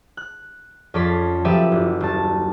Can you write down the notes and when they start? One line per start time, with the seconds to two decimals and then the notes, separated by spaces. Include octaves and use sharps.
0.17 F#6
0.94 F2 C#4 A4 D5 C6 B6
1.45 F3 F#3 G4 B4 D5 E5
1.72 F#1
2.00 D#1 A5